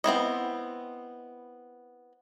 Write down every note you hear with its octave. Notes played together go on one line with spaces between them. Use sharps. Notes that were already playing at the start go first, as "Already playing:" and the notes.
B3 C4 E4 D#5